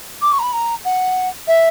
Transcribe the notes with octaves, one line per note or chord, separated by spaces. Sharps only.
D6
C#6
A#5
B5
A#5
F#5
E5